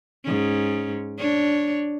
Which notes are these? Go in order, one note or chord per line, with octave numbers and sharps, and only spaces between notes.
G#2 C#4
D4 C#5